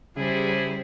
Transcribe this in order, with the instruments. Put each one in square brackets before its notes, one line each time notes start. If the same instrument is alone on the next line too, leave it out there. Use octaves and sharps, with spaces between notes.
[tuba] C#3 [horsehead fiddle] G3 C5 [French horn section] D4 E4 G#4